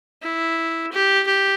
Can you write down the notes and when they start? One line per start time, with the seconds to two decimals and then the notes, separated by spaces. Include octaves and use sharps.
0.22 E4
0.92 G4
1.27 G4